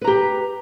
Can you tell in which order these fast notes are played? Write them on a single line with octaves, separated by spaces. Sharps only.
B4 A#5 G4